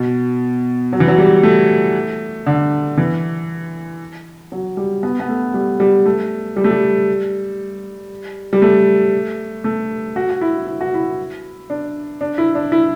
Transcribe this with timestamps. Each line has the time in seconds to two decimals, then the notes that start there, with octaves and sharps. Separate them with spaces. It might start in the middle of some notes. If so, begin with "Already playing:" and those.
Already playing: B2
0.93 F#3
1.00 E3
1.08 F#3
1.18 G3
1.43 A3
2.46 D3
2.97 E3
4.52 F#3
4.77 G3
5.03 B3
5.20 B3
5.29 A3
5.54 G3
5.80 G3
6.06 A3
6.56 G3
6.64 A3
6.71 G3
8.53 G3
8.62 A3
9.64 A3
10.16 F#4
10.30 F#4
10.41 E4
10.67 E4
10.81 F#4
10.94 E4
11.70 D4
12.21 D4
12.38 E4
12.55 D4
12.72 E4